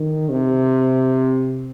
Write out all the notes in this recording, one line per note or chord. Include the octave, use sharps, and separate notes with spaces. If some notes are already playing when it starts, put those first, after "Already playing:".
Already playing: D#3
C3